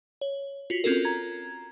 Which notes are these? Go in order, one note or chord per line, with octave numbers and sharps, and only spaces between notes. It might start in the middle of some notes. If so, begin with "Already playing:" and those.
C#5
F4 F#4 B6
C4 C#4 F4 A4 A#4
A#5 G#6